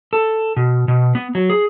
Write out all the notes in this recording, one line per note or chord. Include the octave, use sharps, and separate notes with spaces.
A4
B2
B2
B3
F#3
G#4